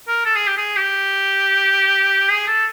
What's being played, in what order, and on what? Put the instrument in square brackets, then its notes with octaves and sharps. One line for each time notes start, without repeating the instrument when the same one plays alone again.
[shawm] A#4
A4
G#4
G4
G#4
G4
G#4
A4